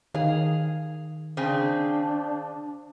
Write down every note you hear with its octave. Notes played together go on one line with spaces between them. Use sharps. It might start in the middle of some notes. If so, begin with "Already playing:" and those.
D#3 G#4 F5
C#3 C4 D4 G#4